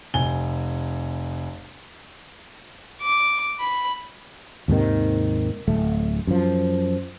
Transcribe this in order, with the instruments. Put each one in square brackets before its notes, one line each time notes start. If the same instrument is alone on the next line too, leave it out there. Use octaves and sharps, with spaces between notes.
[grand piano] F1 C3 G#5 G7
[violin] D6
B5
[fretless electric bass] D#2 G#2 C3 D#3
D1 A3
F#2 F3